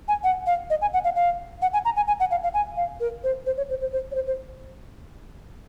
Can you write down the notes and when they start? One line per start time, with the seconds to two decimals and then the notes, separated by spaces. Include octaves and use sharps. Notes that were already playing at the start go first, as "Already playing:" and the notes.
0.08 G#5
0.24 F#5
0.47 F5
0.70 D#5
0.81 G#5
0.93 F#5
1.04 F5
1.16 F5
1.62 F#5
1.73 G#5
1.85 A#5
1.96 G#5
2.07 G#5
2.20 F#5
2.31 F5
2.43 F5
2.54 G#5
2.77 F5
3.00 A#4
3.24 C5
3.46 C5
3.57 C#5
3.70 C5
3.81 C5
3.92 C5
4.11 C#5
4.15 C5
4.27 C5